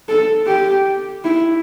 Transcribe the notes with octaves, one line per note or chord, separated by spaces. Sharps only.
A4
G4
E4